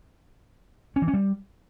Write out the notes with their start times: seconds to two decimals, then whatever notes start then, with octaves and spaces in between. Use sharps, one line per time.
0.96 C#4
1.02 E3
1.08 C#4
1.14 G3